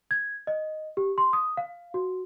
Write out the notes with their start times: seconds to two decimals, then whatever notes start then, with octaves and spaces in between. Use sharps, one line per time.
0.11 G#6
0.47 D#5
0.97 G4
1.18 C6
1.33 D#6
1.57 F5
1.94 F#4